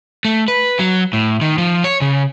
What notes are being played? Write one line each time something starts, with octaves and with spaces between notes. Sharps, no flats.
A3
B4
F#3
A2
D#3
F3
C#5
C#3